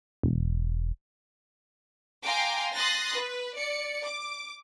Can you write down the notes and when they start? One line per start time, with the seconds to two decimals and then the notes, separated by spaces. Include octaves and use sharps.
0.23 E1
2.24 F5 G5 G#5 A#5 C6 D6
2.73 C6 D#6 F#6 A6 A#6
3.13 B4
3.56 D5 C#7
4.04 D6